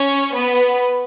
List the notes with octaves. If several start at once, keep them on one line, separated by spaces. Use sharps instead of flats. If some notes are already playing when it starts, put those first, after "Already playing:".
Already playing: C#4 C#5
B3 B4